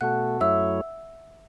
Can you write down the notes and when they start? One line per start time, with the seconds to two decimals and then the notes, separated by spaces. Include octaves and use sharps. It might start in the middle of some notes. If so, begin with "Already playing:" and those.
0.01 B2 A3 F#4 A4 F#5 F#6
0.41 F#2 F#3 A3 E4 C#5 E5 E6